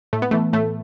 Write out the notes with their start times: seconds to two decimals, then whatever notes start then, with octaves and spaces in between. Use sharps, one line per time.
0.13 A2 A3
0.22 B3
0.31 E3 A3
0.53 A2 A3